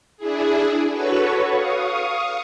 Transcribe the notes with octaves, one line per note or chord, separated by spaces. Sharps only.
D4 E4 G#4
F#4 A4 B4 C#5 C#6
F5 C#6 D#6